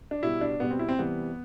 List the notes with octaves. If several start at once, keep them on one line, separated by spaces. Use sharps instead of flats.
D4
B2 G3 E4
D4
B2 G3 B3
C4
E4
C4
C3 E3 G3 B3